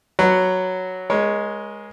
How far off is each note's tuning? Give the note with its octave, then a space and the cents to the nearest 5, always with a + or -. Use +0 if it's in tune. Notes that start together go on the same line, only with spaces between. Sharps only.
F#3 +0 B4 +0 F#5 +0
G#3 +0 A#4 +40 C#5 +0